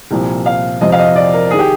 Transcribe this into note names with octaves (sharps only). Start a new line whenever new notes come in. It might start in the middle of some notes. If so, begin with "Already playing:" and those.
C2 A#2 F3
F5
F2 C3 F3 D#5
F5
D#5
D5
A#4
D#3 G#4
G4